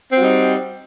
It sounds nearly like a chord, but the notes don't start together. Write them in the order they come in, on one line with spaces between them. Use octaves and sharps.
C4 F#4 G3 D#4